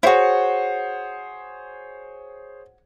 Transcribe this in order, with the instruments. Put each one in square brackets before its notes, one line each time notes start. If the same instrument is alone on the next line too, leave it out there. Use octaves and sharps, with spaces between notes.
[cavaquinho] E4 F#4 [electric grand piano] G#4 C5 C#5